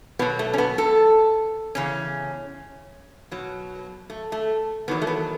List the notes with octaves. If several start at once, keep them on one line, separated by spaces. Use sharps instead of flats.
B2 F#3 B3
A3
C#4
B3
A4
E2 C#3 C#4
B2 F#3
A3
A3
E2 D#3 F#3 B3
A3
B3